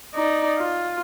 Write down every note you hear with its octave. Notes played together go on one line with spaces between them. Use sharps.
D#4 D5
F4